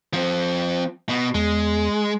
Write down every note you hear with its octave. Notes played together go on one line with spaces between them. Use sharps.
F3 C4
B2
E2 G#3